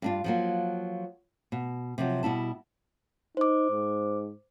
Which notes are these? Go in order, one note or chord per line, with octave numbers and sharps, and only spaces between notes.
G2 D4 F4
F3 F#3 A#3
B2
C3 F3 F#3
B2 G3 E4 A5
D#4 C5 D6
G#2